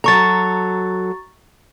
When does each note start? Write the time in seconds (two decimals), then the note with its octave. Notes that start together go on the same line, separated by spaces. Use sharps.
0.04 F#3 A4 A#5 C#6 A6